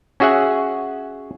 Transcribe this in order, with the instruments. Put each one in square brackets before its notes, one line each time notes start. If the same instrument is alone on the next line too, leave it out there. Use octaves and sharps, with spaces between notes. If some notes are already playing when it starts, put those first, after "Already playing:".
[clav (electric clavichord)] C#4 F#4 G#4 E5 F#5